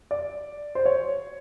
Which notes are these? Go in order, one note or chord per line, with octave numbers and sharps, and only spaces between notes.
D5
C5
C#5